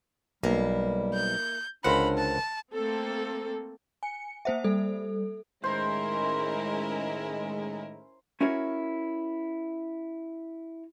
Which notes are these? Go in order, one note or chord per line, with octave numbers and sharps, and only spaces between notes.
B1 G3 A#3 E4
G6
C#2 D3 D4 A#4 C5 F#5 B5
A5
A3 A#3 C4 A4
G#5 C#7
A#3 C5 E5 F#5
G3 A4
A2 D#3 G#3 C#4 E4 A#4 C5
C#4 E4 F#4 A#4 C#5